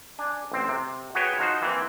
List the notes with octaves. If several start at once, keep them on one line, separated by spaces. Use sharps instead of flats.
D4 G#5
A1 C4
C3
F#4 G#4 B4 C#5 G5
F3 D#4 F#4 C5
E3 A#3 C4